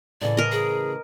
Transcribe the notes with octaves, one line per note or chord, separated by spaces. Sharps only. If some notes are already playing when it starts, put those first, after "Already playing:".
A2 C#3 E3 D5
A#4 D#5
G#4